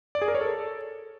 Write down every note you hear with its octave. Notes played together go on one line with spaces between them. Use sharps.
D5
G#4
A#4
C#5
A4